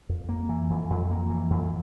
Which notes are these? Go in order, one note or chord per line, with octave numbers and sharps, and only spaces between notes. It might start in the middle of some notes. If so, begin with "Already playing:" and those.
F2
A#3
E3
F2
F2
A#3
E3
F2